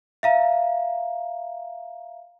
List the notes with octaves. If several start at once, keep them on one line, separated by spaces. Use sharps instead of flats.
E5 F5 A#5